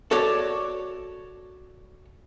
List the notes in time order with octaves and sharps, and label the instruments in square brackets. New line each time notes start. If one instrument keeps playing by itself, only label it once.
[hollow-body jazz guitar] F#4 A4 C#5 D5